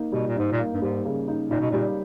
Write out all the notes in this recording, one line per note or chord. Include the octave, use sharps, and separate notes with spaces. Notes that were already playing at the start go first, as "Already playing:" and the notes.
Already playing: A#3 D#4
B2 G3
A#2
G#2 D#4
A#2
A#3
G2
G#2 G3
C#3
D#4
A#2 D#4
B2
A#2 G3